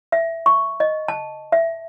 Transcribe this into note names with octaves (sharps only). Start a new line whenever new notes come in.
E5
C#6
D#5
A5
E5